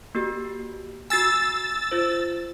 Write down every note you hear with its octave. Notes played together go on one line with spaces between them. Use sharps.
A#3 F#4 G4
F#4 G#5 E6 A6
F4 C5